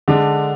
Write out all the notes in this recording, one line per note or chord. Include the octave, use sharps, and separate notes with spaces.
D3 G#3 D4